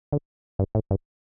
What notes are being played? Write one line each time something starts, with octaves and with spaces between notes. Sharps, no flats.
D3
G2
A2
G2